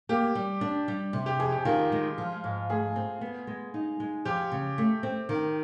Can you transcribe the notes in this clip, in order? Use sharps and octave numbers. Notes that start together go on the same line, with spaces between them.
A#3 G4
G3
D4
G3
C3
G4
F2 G#4
G4
D#3 F4
G#3
F3
G#2
A3 G#4
C4
B3
G#3
D#4
G#3
F3 G4
C#3
A3
C4
D#3